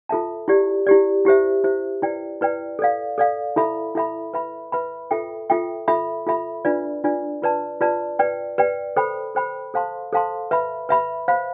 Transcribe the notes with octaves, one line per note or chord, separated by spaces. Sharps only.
F4 A4 E5 A5
E4 G4 D5
E4 G4 D5
E4 G4 C5 E5
E4 G4 C5 E5
E4 B4 D5 G5
E4 B4 D5 G5
A4 D5 F5
A4 D5 F5
E4 A4 E5 B5
E4 A4 E5 B5
B4 E5 B5
B4 E5 B5
F4 A4 E5 G5
F4 A4 E5 G5
F4 A4 E5 B5
F4 A4 E5 B5
D4 F4 B4 D5
D4 F4 B4 D5
F4 B4 D5 A5
F4 B4 D5 A5
B4 D5 G5
B4 D5 G5
A4 C5 G5 B5
A4 C5 G5 B5
A4 C5 F5 A5 C6
A4 C5 F5 A5 C6
B4 E5 B5
B4 E5 B5
C5 F5 B5